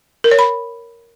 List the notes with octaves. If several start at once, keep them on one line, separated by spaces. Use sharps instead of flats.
A#4
C#5
B5